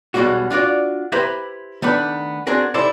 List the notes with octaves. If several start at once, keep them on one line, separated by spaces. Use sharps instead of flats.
B1 E2 B2 G3 G#3 F#4
D4 F4 F#4 D5
E4 G4 B4 C5 E5 A#5
D#3 A3 B3 D4 B5
C4 D4 F#4 G#4 A#4
D#4 E4 G4 A4 C5 D5